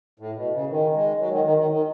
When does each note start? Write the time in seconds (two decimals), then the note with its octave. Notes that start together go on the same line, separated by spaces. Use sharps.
0.20 A2
0.36 B2
0.53 C#3
0.70 D#3
0.95 G#3
1.20 F#3
1.33 D#3
1.45 D#3
1.58 D#3
1.70 D#3